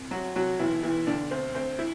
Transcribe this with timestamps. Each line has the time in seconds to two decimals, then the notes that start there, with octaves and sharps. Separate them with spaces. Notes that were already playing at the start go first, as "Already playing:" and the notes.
Already playing: C2
0.11 C3 F#3 F#4
0.36 C2 F#3 F#4
0.59 B1 E3 E4
0.83 B1 E3 E4
1.07 B1 D3 D4
1.31 D2 C4
1.55 D2 C4
1.79 E4